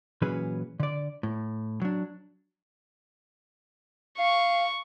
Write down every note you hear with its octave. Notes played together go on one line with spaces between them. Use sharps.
A#2 E3 F#3 C#4 G#4 B4
D3 D5
A2
F#3 D4
F5 C#6